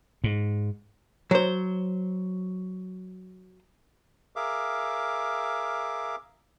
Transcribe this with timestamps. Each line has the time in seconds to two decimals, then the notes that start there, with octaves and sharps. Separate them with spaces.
0.24 G#2
1.31 F#3 C5
4.36 G#4 A#4 E5 F5 D6